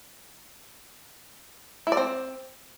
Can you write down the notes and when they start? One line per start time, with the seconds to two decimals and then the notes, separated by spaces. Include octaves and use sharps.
1.87 E4
1.92 D5
1.97 C4